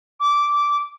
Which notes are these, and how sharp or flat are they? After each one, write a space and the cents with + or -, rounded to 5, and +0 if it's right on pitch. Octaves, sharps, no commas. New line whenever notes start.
D6 -10